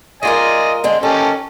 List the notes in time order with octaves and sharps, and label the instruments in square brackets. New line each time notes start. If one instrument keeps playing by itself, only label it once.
[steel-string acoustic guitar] G#3 F4 A#4 [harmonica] D5 D#5 G#5
[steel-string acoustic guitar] D3 G#3 C4
[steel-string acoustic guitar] D#3 [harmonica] C#4 G4 A4